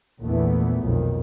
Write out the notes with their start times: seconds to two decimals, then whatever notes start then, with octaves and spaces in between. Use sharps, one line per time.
0.22 A#1 E2 A#2 E3 A3 B3
0.83 B1 F2 D#3